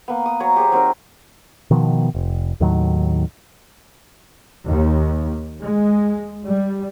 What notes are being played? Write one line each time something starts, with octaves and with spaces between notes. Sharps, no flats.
A#3 B3
D#6
F#3 C#5 A#5
G4 G#4 C5
F#3 C4 D#4 A#4
B2 D#3 F3 B3
F1
D#2 A2 D#3 F#3
D#2
G#3
G3